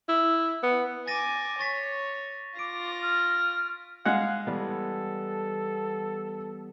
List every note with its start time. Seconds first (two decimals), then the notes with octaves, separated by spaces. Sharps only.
0.08 E4
0.63 B3
1.08 G#5 D6 A6 A#6 D#7
1.59 C#5 C#6 A6 B6
2.59 F4 D6 A#6 D7
3.02 F6
4.05 G#3 F5 F#5
4.47 E3 G3 B3 A4